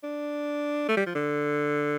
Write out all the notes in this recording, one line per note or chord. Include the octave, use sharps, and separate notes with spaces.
D4
A3
G3
F3
D3